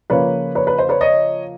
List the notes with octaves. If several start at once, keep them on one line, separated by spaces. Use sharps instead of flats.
C#3 F3 A#3 B4 C#5
B4 C#5
B4
C5
B4 C#5
C#5 D#5